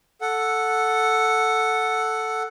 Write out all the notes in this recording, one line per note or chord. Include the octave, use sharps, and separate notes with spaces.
A4 F#5